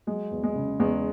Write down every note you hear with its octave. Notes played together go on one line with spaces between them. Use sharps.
F#3 G#3
E2
G#3
C#3
E2 G#3